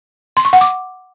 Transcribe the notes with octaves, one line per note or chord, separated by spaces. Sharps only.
C6
C#6
F#5
D6